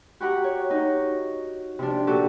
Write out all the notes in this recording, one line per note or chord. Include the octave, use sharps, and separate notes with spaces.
F#4 G4 F#5 A#5
C#5
D#4 F#4
C3 F3 D4
A#2 F#4 G4 A4